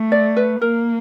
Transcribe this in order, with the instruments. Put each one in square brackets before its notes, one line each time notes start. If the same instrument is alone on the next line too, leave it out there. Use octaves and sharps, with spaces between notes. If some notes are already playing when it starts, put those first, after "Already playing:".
Already playing: [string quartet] A3
[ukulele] D5
B4
[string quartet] A#3 [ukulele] A#4